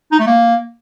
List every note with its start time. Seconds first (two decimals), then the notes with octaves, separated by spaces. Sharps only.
0.12 D#4
0.19 A3
0.27 A#3